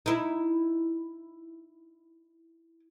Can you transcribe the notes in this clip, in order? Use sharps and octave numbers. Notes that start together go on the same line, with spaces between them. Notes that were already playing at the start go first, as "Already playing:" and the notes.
D#4 E4